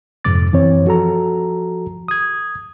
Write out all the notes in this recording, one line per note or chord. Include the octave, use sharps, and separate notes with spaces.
F2 G#2 C3 D6 A6
F#2 E3 C4 C#5
F3 F#4 A4 A#5
D#6 G#6